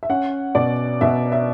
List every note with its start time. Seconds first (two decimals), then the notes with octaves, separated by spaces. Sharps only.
0.03 E5
0.10 C#4 F#5
0.55 B2 D5
1.01 B2 E5
1.32 E5